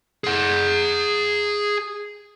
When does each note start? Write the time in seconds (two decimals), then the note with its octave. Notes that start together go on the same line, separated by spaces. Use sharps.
0.24 G#4 F#5